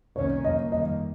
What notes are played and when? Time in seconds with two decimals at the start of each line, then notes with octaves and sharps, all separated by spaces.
0.16 C2 C3 D#3 A#3 C#4 C#5
0.44 G1 G2 F3 A#3 D#5
0.72 F2 D#3 G3 A#3 D#5